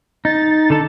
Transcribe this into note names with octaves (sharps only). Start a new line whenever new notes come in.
D#4 A6
D3 A4